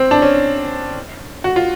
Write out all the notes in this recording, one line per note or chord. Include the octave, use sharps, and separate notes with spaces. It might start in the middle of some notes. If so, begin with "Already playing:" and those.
Already playing: C4
D4
C#4
F#4
F4